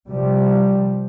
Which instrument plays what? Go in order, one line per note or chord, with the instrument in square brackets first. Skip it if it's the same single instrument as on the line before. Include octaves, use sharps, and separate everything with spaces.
[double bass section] C3 F3 G3